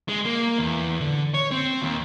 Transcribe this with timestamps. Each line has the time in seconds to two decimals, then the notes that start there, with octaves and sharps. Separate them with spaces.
0.08 G#3
0.25 A#3
0.58 E2
1.01 D3
1.34 C#5
1.51 C4
1.82 D#2